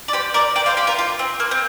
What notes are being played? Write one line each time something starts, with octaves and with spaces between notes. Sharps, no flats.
D5
G4 C5
A#4 D5
D5 G5
C5 F5
G4 C5
F4 A#4
F4
C4
A#3
C4